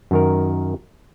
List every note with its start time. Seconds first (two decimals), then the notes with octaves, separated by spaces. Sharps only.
0.11 F#2 D#3 A#4